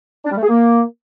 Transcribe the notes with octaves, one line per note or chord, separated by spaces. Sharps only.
D4
G3
A3
G#4
A#3